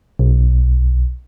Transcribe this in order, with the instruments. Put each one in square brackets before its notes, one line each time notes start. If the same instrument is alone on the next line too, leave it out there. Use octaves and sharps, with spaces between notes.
[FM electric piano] B1